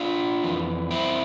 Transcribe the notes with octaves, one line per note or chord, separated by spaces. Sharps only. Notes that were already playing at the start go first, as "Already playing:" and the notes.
Already playing: D4 F4
F2 E3
C4 E4